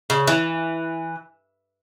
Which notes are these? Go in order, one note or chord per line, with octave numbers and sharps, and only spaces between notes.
C#3
E3